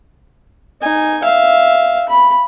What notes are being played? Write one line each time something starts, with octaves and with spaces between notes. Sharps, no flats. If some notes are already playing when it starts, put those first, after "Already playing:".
D#4 G#5
E5 F5
B5